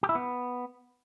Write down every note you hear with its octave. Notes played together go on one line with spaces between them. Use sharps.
G4
E4
B3